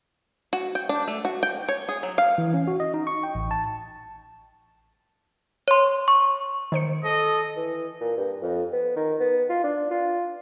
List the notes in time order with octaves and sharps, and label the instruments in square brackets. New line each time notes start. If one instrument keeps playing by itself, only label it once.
[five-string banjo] F#4
G5
D4
A3
F#4
G5
C#5
G#4
F#3
F5
[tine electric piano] E3
C#4
F#4
D#5
D#4
C#6
G5
A1
A5
[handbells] C#5 C6
C#6
[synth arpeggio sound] D#3 C5 C#7
[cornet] A4 [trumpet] D#5
[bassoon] E3
A#2
G2
F2
B3
D#3
B3
F4
D4
F4